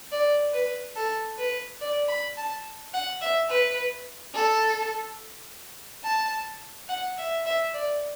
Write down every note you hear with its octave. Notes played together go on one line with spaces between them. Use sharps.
D5
B4
A4
B4
D5
B5
A5
F#5
E5
B4
A4
A5
F#5
E5
E5
D5